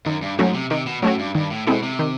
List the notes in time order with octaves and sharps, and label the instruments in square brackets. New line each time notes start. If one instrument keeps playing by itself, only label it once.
[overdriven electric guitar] F#2 [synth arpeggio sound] D#3
[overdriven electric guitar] G2
[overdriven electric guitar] G#2 [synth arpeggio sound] F#3 A3 C#4 F#4
[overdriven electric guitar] C3
[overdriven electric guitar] C3 [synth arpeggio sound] D#3
[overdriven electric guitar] B2
[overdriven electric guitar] A2 [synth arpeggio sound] F#3 A3 C#4 F#4
[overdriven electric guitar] G2
[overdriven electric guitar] G2 [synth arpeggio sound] D#3
[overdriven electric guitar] A2
[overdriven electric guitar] B2 [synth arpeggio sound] G#3 C4 E4 A4
[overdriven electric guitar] C3
[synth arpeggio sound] D#3